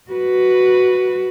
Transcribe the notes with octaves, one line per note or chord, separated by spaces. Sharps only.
F#4 B4